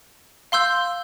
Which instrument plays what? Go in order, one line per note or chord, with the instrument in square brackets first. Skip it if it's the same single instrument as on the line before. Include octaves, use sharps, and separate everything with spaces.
[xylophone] F5 C6 E6 G6